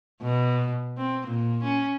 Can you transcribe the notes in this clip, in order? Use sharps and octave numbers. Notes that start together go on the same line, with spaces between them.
B2
C4
A#2
C#4